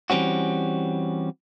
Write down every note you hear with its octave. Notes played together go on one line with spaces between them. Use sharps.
E3 G3 C4 C#4 F#4